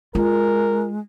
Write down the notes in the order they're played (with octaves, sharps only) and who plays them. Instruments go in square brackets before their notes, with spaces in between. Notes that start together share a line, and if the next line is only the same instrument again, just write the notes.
[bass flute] G#3 [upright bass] F4 [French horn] A#4